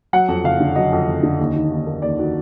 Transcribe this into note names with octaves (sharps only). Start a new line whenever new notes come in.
F#3 F#5
F2
F#1 F5
D3
F#3 D#5
F2
F#1
D3
D#2
D#3
D#2
A#3
D#2 D5
D#3 F#4